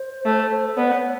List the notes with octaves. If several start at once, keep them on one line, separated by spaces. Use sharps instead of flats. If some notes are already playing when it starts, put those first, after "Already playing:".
Already playing: C5
A3
B3 D5
C5
C#5